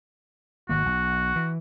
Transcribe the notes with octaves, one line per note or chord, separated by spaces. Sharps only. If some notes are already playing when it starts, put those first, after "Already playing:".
G#1 D#3 A#3 F#4
B1
E3